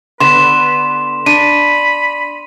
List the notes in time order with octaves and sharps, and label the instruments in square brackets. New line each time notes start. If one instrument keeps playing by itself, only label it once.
[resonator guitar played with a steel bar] D3 B3 [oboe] B4 [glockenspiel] C6 E7
[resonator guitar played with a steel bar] D4 [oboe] B5 [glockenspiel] D#7